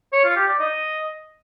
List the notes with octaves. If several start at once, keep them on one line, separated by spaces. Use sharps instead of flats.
C#5
F4
G4
D5
D#5